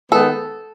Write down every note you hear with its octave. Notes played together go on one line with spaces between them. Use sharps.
D#3 G#3 B3 A4